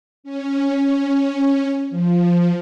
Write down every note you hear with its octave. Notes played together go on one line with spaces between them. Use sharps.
C#4
F3